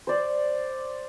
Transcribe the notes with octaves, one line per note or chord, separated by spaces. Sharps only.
C5 D5